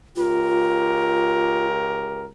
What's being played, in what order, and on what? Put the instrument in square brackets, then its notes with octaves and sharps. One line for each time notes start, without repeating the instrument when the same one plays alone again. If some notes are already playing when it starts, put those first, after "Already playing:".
[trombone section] C#2 G4 A#4 [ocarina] F4